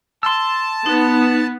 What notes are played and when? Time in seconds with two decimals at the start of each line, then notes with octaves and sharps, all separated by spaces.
0.23 A5 C6 E6
0.86 B3 D#4